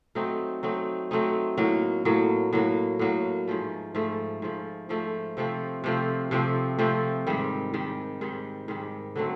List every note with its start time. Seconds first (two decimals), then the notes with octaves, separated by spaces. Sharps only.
0.15 F#3 A3 C4 D#4
0.63 F#3 A3 C4 D#4
1.11 F#3 A3 C4 D#4
1.58 A2 F#3 A#3
2.05 A2 F#3 A#3
2.53 A2 F#3 A#3
2.99 A2 F#3 A#3
3.48 G#2 F3 A3
3.95 G#2 F3 A3
4.42 G#2 F3 A3
4.89 G#2 F3 A3
5.37 C3 F3 A3 C4
5.84 C3 F3 A3 C4
6.31 C3 F3 A3 C4
6.79 C3 F3 A3 C4
7.27 G#2 D#3 G3
7.74 G#2 D#3 G3
8.21 G#2 D#3 G3
8.68 G#2 D#3 G3
9.16 D3 F#3 A3 C4